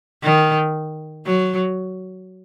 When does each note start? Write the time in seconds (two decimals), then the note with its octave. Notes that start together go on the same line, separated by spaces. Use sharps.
0.23 D#3
1.26 F#3